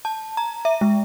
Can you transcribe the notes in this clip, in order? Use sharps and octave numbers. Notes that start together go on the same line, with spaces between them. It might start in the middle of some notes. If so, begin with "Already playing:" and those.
A5
A#5
E5
G#3